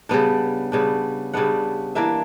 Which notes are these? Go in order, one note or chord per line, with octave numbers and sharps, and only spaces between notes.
C#3 G3 B3 D4 F#5
C#3 G3 B3 D4
C#3 G3 B3 D4 F#5
E3 A#3 D4 E5